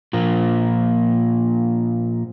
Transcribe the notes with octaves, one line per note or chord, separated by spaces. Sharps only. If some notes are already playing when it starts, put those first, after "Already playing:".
A#2 F3 A#3